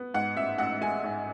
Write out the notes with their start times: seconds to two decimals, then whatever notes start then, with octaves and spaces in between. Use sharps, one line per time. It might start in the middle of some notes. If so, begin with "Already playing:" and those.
Already playing: B3
0.14 G#2 F#5
0.36 A1 E5
0.58 A1 F#5
0.81 G#3 G#5
1.04 G#2